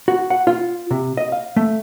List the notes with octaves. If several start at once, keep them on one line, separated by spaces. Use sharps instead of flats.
F#4
F#5
F4
C3
D#5
F5
A3